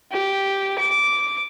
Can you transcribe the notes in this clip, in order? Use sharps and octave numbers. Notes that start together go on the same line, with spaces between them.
G4
D6